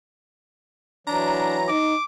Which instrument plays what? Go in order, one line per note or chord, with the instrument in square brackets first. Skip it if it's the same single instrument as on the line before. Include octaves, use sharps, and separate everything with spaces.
[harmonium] E3 F#3 [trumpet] D4 [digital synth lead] A#5
[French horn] D#4 [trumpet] D6